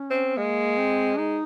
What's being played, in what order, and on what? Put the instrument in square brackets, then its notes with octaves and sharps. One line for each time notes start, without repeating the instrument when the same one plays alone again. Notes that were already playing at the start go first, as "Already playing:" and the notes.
Already playing: [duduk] C#4
[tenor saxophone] C4
[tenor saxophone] G#3 [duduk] A#3
[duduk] C4
[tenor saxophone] G#3 [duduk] D#4